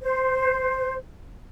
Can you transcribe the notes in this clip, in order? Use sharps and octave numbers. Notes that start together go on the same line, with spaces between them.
C5